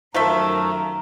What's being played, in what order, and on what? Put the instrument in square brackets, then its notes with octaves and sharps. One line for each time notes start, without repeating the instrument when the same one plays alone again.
[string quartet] F#2 D#3 A#4 [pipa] F3 A3 E5 [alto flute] A#5